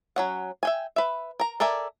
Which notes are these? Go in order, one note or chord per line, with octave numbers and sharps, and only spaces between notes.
F#3 C#4 F#5
E5 G5 G#5
B4 E5
A#4 A#5
A4 A#4 D5 E5 G#5